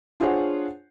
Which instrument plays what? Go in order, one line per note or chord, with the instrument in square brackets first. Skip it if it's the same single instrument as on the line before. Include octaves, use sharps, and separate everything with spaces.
[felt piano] D4 F4 G#4 C5 C#5 F#5